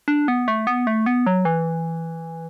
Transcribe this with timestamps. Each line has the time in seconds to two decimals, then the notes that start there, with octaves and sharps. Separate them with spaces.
0.08 D4
0.28 B3
0.48 A3
0.67 B3
0.87 A3
1.06 B3
1.26 F#3
1.45 E3